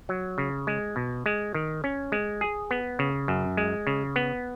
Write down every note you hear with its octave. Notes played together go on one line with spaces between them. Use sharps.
F#3
C#3
G#3
B2
G#3
D#3
C#4
G#3
G#4
B3
C#3
F#2
G#3
C#3
B3